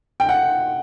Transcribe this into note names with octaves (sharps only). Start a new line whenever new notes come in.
G5
F#5